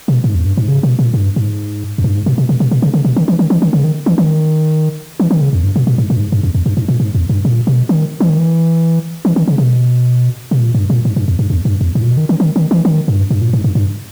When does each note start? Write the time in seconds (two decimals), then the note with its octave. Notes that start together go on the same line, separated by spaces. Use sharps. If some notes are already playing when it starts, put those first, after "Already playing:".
0.08 B2
0.24 G#2
0.35 E2
0.46 G2
0.57 G#2
0.68 C#3
0.83 B2
0.99 A#2
1.14 G2
1.36 G#2
1.98 E2
2.04 G2
2.15 G#2
2.26 B2
2.38 B2
2.49 B2
2.60 B2
2.71 B2
2.82 C#3
2.94 C#3
3.05 B2
3.16 D#3
3.28 E3
3.39 D#3
3.50 E3
3.62 D#3
3.73 C#3
3.84 D#3
4.06 E3
4.18 D#3
5.20 E3
5.31 D#3
5.41 C#3
5.53 E2
5.64 G2
5.76 B2
5.87 A#2
5.98 G#2
6.10 A#2
6.17 G2
6.20 G#2
6.32 G2
6.43 E2
6.54 E2
6.66 G2
6.77 G#2
6.88 A#2
7.00 G#2
7.15 E2
7.29 G2
7.45 A#2
7.67 B2
7.89 D#3
8.20 E3
8.29 D#3
8.38 E3
9.25 E3
9.36 D#3
9.48 C#3
9.58 B2
10.51 B2
10.60 A#2
10.74 G2
10.90 A#2
11.05 G#2
11.16 G2
11.28 E2
11.39 G2
11.50 E2
11.65 G2
11.81 E2
11.95 G#2
12.02 A#2
12.07 B2
12.17 D#3
12.29 D#3
12.40 D#3
12.56 D#3
12.71 E3
12.85 D#3
13.08 G2
13.30 G2
13.41 A#2
13.53 G#2
13.64 G2
13.75 G2